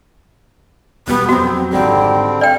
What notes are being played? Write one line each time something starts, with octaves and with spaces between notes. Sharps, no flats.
E1 B2 G3 B3
F2 F#3 C4 F#4
G#1 D3 G3 G#3 C4 G5
D5 F5 G5